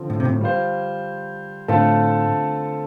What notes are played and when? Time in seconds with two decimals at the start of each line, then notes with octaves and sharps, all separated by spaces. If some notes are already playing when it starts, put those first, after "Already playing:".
Already playing: D3 F3 C4
0.10 A2
0.20 C3
0.25 A2
0.41 G3 F4 C5
1.68 A2 D3 A3 C4 F4 A4